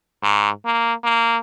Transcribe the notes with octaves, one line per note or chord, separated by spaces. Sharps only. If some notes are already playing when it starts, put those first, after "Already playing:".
G#2
A#3
A#3